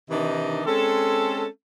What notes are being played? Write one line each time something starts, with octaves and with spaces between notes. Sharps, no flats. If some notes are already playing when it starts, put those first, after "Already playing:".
C3 D#3 E3 D4 D#4 D#5
G#3 C4 C#4 A4